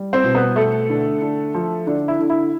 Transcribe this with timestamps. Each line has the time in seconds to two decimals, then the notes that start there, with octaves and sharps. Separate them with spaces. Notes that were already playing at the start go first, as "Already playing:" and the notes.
Already playing: G3
0.13 C4 C5
0.24 B2
0.35 B3 B4
0.56 A3 A4
0.90 D3
1.22 D3
1.54 F3
1.87 D3 D4
2.08 E4
2.20 D3
2.30 E4